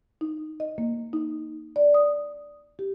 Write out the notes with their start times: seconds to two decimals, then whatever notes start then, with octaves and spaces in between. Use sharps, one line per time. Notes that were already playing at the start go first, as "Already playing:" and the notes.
0.21 D#4
0.60 D#5
0.78 A#3
1.13 D#4
1.76 D5
1.94 D#6
2.79 G4